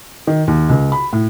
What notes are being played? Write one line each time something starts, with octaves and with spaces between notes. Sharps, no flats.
D#3
D#2
C#2
B5
A2